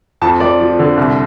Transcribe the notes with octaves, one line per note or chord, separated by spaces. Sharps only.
F2 A5
F2 D5
F3
D3
C2